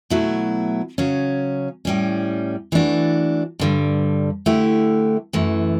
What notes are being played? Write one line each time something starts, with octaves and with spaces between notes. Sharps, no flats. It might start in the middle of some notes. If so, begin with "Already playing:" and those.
B2 F#3 A3 E4
C#3 F#3 C#4
A2 G3 C#4
E3 A3 D4 F#4
G2 D3 G3
D3 A3 E4 G4
F#2 E3 A3